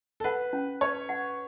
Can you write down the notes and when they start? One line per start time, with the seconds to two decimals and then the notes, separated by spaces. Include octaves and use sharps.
0.20 A4
0.24 B4 F#5
0.53 C#4
0.81 B4 C#5
1.09 F#5